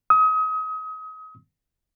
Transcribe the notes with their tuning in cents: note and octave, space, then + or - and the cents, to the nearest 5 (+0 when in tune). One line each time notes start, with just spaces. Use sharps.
D#6 +30